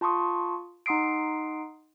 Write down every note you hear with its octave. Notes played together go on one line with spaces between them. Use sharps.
F4 A5 C6 C#6 D#6
D#4 F#5 C6 D#6 C7 D7